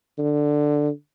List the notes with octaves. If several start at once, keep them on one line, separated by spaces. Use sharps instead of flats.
D3